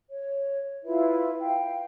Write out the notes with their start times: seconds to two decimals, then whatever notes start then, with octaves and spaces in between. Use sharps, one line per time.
0.11 C#5
0.84 E4 F4 B4 E5
1.39 F5 G5